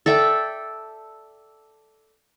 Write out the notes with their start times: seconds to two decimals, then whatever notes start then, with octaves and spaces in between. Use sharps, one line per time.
0.06 A4 D5 E5 G5